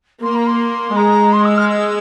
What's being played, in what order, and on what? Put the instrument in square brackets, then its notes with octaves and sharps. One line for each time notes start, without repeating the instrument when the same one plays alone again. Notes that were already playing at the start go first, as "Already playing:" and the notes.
[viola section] A#3 [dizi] C6
[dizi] A#5
C6
[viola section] G#3 [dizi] A#5
[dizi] C6
E6
F6
E6